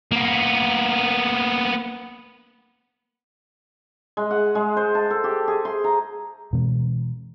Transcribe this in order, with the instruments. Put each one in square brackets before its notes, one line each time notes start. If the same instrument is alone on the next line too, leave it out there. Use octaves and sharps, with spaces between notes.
[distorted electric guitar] A#3 B3
[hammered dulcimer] G#3
F#5
G#3
C5
A5
A4
G4
G#4
C6
A#5
[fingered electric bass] B2 E3 G#3 C4